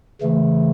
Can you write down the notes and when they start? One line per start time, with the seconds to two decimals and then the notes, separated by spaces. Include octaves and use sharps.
0.21 C#3 E3 A3